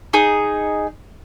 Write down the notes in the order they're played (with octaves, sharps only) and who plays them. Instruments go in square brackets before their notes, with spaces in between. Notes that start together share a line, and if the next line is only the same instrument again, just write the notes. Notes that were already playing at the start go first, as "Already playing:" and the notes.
[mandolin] D#4 G#4